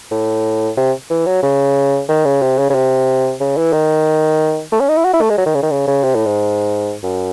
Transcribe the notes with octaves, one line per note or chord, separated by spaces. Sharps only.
A2
C3
E3
F#3
C#3
D#3
C#3
C3
C#3
C#3
C3
C#3
E3
D#3
A3
C#4
D#4
E4
F#4
E4
A3
G#3
F#3
D#3
C#3
D#3
C#3
C#3
C3
A2
G#2
F#2